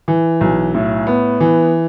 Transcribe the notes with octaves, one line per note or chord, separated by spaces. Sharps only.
E3
B1
A2
B3
E3